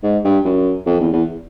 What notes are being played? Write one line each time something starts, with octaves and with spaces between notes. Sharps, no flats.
G#2
G2
F#2
F2
E2
E2